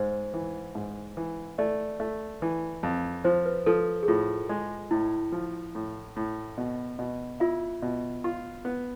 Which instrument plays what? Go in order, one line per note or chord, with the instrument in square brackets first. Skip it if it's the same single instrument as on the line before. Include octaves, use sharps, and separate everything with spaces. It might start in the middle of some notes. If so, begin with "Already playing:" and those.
Already playing: [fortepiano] G#2 [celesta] C5
[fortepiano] E3
G#2
E3
[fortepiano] A3 [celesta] D5
[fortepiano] A3
E3
F2
[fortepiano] F3 [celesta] C5
[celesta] B4
[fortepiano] F3 [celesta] A4
[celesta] G#4
[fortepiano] A2 [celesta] F4
[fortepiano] G#3
[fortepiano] A2 [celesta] E4
[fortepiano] F3
A2
A2
B2
B2
[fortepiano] E4 [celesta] F4
[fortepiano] B2
F4
B3